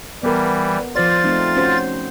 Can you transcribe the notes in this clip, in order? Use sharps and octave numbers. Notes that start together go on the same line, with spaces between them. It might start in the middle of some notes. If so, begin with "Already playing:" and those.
E3 G3 B3 A#4
F3 F4 C5 D5 A6
A3 C4 D#4
C#4 F#4 C5